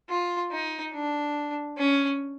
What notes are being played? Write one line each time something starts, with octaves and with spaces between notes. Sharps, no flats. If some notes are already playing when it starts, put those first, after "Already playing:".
F4
D#4
D4
C#4